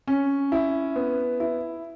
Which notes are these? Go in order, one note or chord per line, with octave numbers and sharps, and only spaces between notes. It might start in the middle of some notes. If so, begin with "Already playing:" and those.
C#4
E4
B3
E4